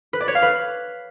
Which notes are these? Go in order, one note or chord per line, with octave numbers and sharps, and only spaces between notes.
B4
D5
C#5
F5
B4